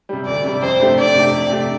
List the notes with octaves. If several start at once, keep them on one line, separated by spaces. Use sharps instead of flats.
C3 G3
D2 D5
C3 G3
F2 C5
C3 A3 D4 G4
F2 D5
C3 A3 D4 G4
F2
C3 A3 D4 G4